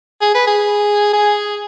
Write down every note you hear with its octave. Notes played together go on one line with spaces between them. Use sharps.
G#4
B4
G#4
G#4